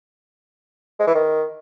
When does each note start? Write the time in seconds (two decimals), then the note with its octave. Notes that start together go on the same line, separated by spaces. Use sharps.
0.99 G#3
1.07 E3
1.14 D#3